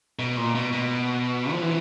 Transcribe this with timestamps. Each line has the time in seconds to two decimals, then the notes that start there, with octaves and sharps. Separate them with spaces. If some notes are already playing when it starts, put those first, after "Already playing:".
0.19 B2
0.37 A#2
0.55 B2
0.73 B2
1.52 F3
1.62 E3